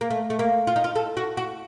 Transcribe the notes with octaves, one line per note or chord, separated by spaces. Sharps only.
A#3
A3
A3
A#3
F4
D#4
F4
A4
F#4
F#4